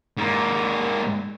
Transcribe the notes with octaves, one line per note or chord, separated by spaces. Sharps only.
G#2 A#3